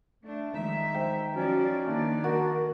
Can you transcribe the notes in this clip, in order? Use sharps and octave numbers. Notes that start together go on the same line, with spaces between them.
A3 D4
D#3 F3 G#3 D#4 E5
C5 G5
F3 C#4 F#4 D5
D#3 A3 A#3 D4 D#4 D5
F#4 A#4